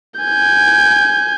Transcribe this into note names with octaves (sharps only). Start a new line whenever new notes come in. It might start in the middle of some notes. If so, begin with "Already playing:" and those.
G#5 G6